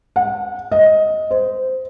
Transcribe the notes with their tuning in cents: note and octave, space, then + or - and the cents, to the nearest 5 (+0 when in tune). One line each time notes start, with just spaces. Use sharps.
F#5 -35
D#5 +10
C5 -15